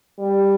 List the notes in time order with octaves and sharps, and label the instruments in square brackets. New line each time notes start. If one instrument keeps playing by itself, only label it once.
[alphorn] G3